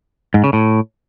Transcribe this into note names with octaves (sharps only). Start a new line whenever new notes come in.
G#2
C#3
A2